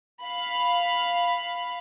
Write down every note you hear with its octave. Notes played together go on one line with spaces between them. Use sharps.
F5 B5